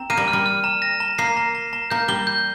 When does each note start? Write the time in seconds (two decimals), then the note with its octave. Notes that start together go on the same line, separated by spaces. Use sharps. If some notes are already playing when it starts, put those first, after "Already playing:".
Already playing: C4 A#5
0.10 A#3 D#7
0.17 G3
0.28 F6
0.33 G3
0.46 F6
0.64 A#5
0.82 A#6
1.00 A#5
1.18 A#3 C7
1.37 A#5
1.55 A#5
1.73 A#5
1.91 A#3 G6
2.08 G3 G7
2.27 G6